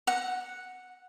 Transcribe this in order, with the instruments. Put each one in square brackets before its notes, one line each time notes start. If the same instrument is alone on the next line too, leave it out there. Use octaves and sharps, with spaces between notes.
[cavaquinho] F#5